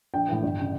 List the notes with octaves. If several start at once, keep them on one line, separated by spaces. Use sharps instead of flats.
A#1 G5
A2 E3
G1
C#3